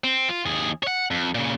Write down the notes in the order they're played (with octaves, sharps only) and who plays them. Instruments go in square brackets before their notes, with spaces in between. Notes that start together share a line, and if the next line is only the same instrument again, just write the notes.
[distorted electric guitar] C4
F4
D#2 G#4
C#5 F#5
F2
A#2 C#3